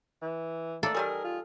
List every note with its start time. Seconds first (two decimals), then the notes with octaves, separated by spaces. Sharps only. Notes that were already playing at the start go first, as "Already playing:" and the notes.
0.22 E3
0.83 A3 A#3 D4 A4
0.95 D#3 G3 G#4 A#4
1.24 F4